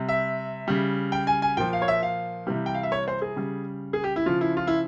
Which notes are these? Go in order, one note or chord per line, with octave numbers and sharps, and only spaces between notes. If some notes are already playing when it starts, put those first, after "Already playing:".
Already playing: C3 G3
E5
C#3 G3
G5
G#5
G#5
A#2 F3 G5
F5
C#5
E5
F5
C3 E3 G3
G5
F5
E5
C#5
C5
G#4
C#3 G3
G#4
G4
E4
C#3 F3 F4
E4
F4
E4